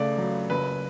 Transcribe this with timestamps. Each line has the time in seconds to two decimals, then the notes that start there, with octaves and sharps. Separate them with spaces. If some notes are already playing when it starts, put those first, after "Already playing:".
Already playing: C#2 C#3 A3 D5
0.18 F#3
0.50 F#1 B4